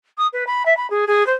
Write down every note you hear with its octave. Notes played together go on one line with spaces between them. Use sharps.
D#6
B4
B5
E5
B5
G#4
G#4
C5